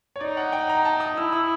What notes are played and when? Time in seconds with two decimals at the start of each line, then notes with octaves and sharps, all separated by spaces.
0.16 C#5
0.21 D#4 D5
0.37 F#5
0.52 G5
0.69 A#5
0.85 A5
1.00 D#6
1.16 E4 E6
1.33 D#6